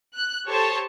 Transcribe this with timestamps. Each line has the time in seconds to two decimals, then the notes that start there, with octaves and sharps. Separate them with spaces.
0.16 F#6
0.47 G4 A4 C5 C#5 A5